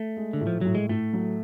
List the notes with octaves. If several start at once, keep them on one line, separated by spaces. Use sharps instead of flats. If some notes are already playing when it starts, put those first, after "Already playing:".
Already playing: A3
G#3
D3
A2
F3
A2 F#3
G#3
A2 A3
F#3